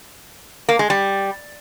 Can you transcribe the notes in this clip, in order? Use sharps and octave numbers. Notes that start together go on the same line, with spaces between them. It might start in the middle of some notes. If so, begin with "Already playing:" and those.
A#3
G#3
G3